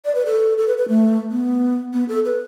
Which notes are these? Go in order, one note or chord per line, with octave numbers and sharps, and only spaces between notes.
D5
B4
A4
A4
B4
B4
A3
B3
B3
A4
B4